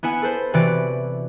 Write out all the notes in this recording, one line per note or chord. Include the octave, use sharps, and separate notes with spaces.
B3 E4 F#5 G#5
A4 B4 C5
C3 E3 F#4 B4 D5 D7